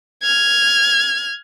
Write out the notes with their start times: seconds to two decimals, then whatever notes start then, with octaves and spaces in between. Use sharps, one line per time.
0.23 F6 G#6